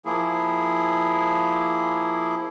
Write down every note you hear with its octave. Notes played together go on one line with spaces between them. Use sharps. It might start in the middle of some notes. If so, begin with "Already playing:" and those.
F3 A#3 E4 G#4